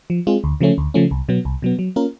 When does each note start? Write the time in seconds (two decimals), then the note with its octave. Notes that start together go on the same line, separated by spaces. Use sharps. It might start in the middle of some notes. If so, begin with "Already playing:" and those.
0.10 F3
0.27 G#3 C4 F4 G#4
0.44 D2
0.61 C#3 F3 A3 C#4
0.78 D2
0.94 C#3 F3 A3 C#4
1.11 C2
1.29 B2 F#3 B3
1.45 C2
1.62 B2 F#3 B3
1.79 F#3
1.96 A#3 C#4 F4 A#4